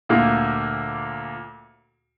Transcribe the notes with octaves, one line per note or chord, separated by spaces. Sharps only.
D2 A#2 A#3